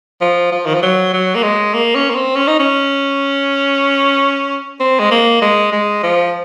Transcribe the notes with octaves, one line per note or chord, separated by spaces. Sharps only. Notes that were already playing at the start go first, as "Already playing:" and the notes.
F3
F3
D#3
F3
F#3
F#3
A#3
G#3
A#3
C#4
A#3
C4
C#4
D#4
C#4
C4
G#3
A#3
G#3
G#3
F3